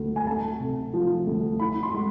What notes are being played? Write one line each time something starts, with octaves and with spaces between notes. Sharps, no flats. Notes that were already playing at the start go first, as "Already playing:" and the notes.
Already playing: D2
G#5
A3 A5
C3
F3
D2
E4 B5
C6
G#3